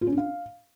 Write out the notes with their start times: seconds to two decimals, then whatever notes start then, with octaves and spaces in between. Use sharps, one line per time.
0.01 F4
0.07 C#4
0.12 D4
0.18 F5